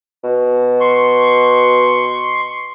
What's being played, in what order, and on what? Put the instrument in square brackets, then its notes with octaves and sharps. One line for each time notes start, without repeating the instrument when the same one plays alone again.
[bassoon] B2
[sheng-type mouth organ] C6 C#6